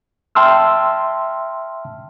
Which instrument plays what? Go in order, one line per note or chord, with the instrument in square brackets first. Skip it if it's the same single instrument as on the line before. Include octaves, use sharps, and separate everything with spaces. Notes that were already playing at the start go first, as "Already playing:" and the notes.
[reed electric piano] E5 G5 A5 C6 E6 F6